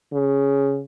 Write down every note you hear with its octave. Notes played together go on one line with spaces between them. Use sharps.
C#3